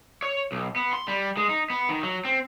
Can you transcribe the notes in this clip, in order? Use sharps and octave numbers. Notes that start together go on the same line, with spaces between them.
C#5
B1
B3
C6
G3
G#3
D#4
B3
D#3
F#3
C4